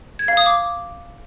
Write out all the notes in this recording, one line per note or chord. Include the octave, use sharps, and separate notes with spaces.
G#6
F5
D#6
D6